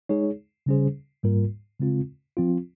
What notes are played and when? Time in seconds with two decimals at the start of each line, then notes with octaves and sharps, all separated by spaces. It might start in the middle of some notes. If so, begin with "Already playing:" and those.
0.09 G#3 D#4 G#4 C#5
0.66 C#3 G3 C#4 G#4 C5
1.23 G#2 G3 A#3 F4 A#4
1.79 C#3 G#3 C4 F4
2.37 F3 C4 F4